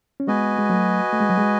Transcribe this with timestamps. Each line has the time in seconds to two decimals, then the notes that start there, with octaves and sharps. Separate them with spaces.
0.20 C#4
0.27 G#3 B3 F#4 B4 D#5 G#5
0.59 G#3
0.70 F#3 A3
1.13 A3
1.20 G#3
1.30 F#3
1.38 G#3